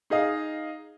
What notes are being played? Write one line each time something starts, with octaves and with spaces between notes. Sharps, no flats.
D#4 G#4 D#5 F5